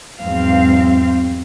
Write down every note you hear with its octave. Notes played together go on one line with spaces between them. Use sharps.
E2 G#2 F#3 C4 F5